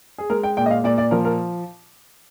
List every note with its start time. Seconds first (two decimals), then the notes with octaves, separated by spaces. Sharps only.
0.18 G#4
0.30 G#3 A#4
0.43 G5
0.57 A#2 G5
0.66 D#5
0.71 F5
0.84 A#2 D5
0.98 D5
1.11 F3 A#4
1.25 A#4